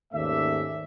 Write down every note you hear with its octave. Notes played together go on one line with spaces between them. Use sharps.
D#2 G#2 A3 C#4 D5 E5